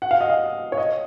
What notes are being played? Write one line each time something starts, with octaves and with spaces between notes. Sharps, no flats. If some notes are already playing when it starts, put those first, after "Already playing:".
F#5
F5
D#5
F5
C#5
D#5